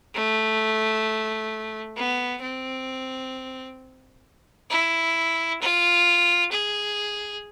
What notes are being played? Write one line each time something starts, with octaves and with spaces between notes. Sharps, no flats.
A3
B3
C4
E4
F4
G#4